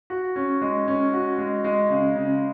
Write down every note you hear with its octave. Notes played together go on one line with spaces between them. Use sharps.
F#4
C#4
G#3
C#4
F#4
G#3
G#3
C#3
C#3